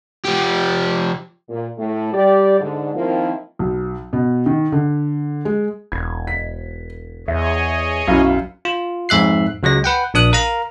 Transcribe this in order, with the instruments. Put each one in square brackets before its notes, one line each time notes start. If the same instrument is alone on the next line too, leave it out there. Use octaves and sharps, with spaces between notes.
[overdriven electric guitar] F3 G4
[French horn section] A#2
A2 A3
G3 G4 D5
G#2 D3
D#3 F3 A#3 C4 E4 F4
[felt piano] B1
B2
D#3
D3
G#3
[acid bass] E1 [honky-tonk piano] G#6
[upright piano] B6
[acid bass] E2 [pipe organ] G#4 C#5 D#5 [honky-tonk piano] E5
[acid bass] B1 [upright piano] F#2 [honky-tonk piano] E4 F5
[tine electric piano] F4
F2 G#2 E5 F#6 C7
C#2 F#3 G#3 A#6
B4 F#5 G5
A#1 D4 D#6 F#6
A#4 F5 A#5